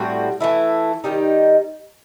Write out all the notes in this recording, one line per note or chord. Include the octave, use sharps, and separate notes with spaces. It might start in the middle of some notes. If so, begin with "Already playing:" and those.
Already playing: A2 G3 C4 F#4
E3 A3 E4
D#3 G3 D#4 G4